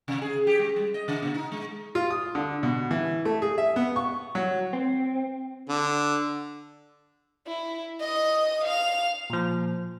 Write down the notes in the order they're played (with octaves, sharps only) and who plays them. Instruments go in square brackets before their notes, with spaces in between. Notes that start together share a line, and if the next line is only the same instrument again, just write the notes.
[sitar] C3
G#4
G4
G#3
G3
D#5
C#3
A#2
D#4
G#3
[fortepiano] F4
D#6
D3
B2
E3
A3
G#4
E5
B3
C#6
F#3
[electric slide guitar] C4
[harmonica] D3
[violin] E4
D#5 D#6
F5 F7
[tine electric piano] A#2 F3